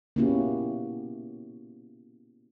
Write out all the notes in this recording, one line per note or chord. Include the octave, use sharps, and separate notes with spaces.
A#3 B3 C#4 E4 F#4 G4